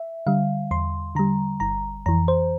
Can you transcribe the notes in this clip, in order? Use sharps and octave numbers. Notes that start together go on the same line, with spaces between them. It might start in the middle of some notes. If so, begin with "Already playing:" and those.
Already playing: E5
D3 G3 F5
E2 C6
D3 G3 A#5
G1 A#5
F2 E3 A#5
C5